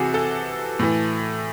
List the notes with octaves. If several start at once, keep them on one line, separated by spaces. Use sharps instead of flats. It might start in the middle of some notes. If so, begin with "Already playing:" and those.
Already playing: C3 E3 F#4 G#4 A4
A4
A2 E3